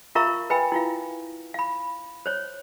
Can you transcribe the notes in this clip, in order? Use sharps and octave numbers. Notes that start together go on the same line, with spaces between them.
F4 A#4 E5 F5 A#5 C#6
B4 E5 G5 G#5 B5
E4 F4 F5
F5 B5
C5 C#5